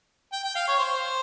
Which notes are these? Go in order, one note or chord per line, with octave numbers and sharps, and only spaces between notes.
G5
G5
F5
C#5
C5